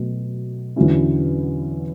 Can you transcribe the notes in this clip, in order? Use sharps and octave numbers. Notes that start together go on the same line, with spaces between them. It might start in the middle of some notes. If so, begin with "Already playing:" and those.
Already playing: B2 F#3 A3
E2 D3 F#3 C#4 E4